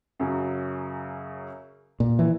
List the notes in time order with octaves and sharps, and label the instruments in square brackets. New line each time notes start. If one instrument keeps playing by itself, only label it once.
[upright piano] F#2 C#3 F#3
[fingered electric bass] A#2
E3